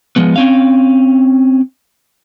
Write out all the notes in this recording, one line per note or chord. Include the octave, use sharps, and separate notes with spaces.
F3 G#3 B3
C4 C#4 F5